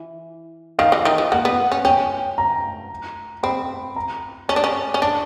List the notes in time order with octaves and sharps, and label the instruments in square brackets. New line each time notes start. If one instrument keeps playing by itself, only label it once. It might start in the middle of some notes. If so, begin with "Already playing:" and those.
Already playing: [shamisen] E3
[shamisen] D#3 [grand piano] F5
[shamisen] E3
D#3
F3
[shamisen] A#3 [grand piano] F#5
[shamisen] B3
C#4
[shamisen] C#4 [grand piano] G5
[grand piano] A#5
[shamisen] C4 [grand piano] B5
[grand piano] A#5
[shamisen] C#4 [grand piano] A5
[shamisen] D4
C#4
C#4
[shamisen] D4 [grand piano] A5